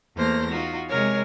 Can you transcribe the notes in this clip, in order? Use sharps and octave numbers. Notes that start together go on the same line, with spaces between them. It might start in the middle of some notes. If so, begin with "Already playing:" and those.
E2 A3 A#3 C5 A#6
D#4 F4 F#4
C3 G#3 A#4 C#5 G#5